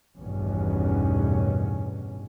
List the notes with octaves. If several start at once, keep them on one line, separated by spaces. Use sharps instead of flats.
A1 E2 G2 B2 D#3 C#4